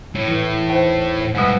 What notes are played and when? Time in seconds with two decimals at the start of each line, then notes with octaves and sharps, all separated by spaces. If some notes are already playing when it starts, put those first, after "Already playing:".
0.15 A2
0.28 E3
0.70 D#2 C5
1.35 G2 B2 G#3 E5 F#5